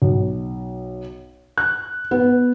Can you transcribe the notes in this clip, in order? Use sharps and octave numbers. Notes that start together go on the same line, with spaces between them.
B1
F#6
B3